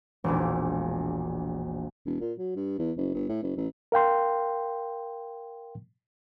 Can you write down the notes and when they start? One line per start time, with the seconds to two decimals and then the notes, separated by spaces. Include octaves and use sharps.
0.24 E1 A#1
2.05 E1
2.21 A#2
2.38 F#3
2.56 G2
2.78 E2
2.97 F#1
3.15 G1
3.29 A2
3.43 F#1
3.57 A1
3.92 A#4 F5 G5 C6